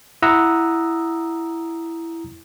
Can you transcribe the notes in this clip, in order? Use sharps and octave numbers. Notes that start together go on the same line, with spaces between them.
E4 F#5 A#5 D#6 E6